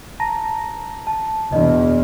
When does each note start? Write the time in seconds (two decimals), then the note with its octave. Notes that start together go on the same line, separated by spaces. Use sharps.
0.20 A5 A#5 A#6
1.07 A5
1.52 E2 B2 D4 D#5